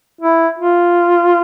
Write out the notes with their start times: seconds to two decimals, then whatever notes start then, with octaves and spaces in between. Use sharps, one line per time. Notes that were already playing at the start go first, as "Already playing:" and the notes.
0.21 E4
0.59 F4